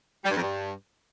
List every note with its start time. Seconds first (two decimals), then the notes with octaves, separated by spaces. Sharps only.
0.25 G3
0.30 G2
0.36 F2
0.41 G2